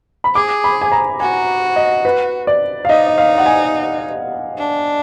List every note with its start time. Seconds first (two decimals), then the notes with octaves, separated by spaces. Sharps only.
0.24 B5
0.35 G#4 D6
0.64 B5
0.82 G#5
0.92 A#5
1.20 F#4 G#5
1.76 D#5
2.05 B4
2.47 D5
2.85 F5
2.89 D#4 D#5
3.07 D#5
3.18 F5
3.38 F#5
3.46 G#5
4.59 D4